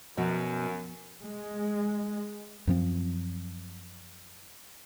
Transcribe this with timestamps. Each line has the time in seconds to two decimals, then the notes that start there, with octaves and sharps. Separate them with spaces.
0.18 F#2 B2 F3
1.24 G#3
2.67 F#2 F3 C4